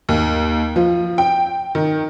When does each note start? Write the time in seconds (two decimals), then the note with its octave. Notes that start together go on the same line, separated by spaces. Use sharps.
0.09 D#2
0.76 F3
1.18 G5
1.75 D#3